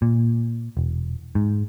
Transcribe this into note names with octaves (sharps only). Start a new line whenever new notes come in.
A#2
E1
G#2